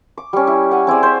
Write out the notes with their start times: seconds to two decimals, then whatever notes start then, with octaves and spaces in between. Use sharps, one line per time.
0.17 D6
0.33 G3 C#4
0.47 E4
0.71 F#5 G#5
0.87 C4 E4 G#4 D5
1.03 C5 E5